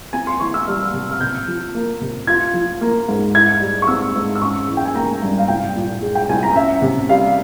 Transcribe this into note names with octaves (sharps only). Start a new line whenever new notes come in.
C4 G#5
C6
E3 C#6
E6
G3 F6
C3
F6
C3 G6
F3
A#3
C3
F4 G#6
F3
A#3
G#2
E4 G#6
G3
C#6
C4 E6
G#2
E6
C#4 C#6
E3
G5
G#5
A#3 A#5
G2
F5
C2 G5
A#2
G#3
G5
C2 G#5
A#5
C#4 E5
C3
G3 F5